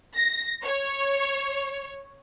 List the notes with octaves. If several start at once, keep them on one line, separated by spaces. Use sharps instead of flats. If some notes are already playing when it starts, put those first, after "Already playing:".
A#6
C#5